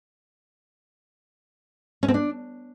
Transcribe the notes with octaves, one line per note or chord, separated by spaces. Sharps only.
C#4
C4
D4